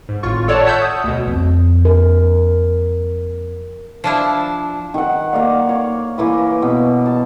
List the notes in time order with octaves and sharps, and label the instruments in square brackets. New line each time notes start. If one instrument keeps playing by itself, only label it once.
[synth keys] G#2
G#1 A2 F4 C#6
A4 C#5 D5 F#5 A5
C#5 E5 F#5 A5 E6 G6
D#6
D2 B2
[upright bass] F2
[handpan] A#4
[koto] F3 D4 E4
[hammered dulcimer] D#3 F#5
A#3 D5 F5
C#5
E3 A#3 B4
B2
A5